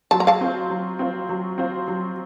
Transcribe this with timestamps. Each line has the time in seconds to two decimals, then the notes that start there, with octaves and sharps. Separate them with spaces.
0.11 F#3 A5
0.20 A#5
0.27 F5 A5
0.41 C4 F4 C5
0.70 F#3
0.99 C4 F4 C5
1.29 F#3
1.58 C4 F4 C5
1.88 F#3